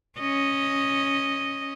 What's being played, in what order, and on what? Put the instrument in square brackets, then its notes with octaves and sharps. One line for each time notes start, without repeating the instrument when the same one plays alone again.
[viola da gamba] C#4 D#5